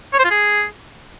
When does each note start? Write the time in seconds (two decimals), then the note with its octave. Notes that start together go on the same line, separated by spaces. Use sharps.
0.13 C#5
0.19 C5
0.25 F4
0.30 G#4